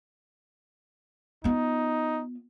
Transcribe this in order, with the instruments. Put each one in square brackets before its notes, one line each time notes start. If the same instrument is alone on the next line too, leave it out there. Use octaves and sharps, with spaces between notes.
[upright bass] B3 F4 [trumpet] D#4